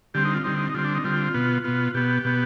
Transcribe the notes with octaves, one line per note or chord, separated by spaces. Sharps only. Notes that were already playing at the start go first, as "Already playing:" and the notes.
D3 G3 C4 G4
D#4
F4
D3 G3 C4 D#4
D#4
D#4
D3 G3 C4 F4
D4
D#4
D3 G3 C4 F4
B2 B3
B2 B3 F4
B2 B3 G4
B2 B3